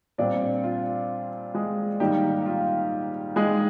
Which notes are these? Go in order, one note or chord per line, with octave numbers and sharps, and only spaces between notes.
A#2 G3 C4 D4 D5
F4
G#3 G#4
G#2 D#3 G3 A#3 G4
F4
G#3 G#4